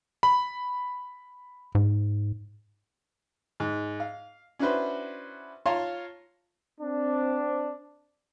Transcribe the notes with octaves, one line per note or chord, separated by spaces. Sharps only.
B5
G#2
G#2
F5
C#4 D4 E4 F#4 B4 C5
F4 C#5 F5 A5 A#5 C6
C4 D4